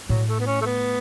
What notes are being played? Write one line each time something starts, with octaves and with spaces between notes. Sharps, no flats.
A2 F#3
A3
B3
C#4
A3
B3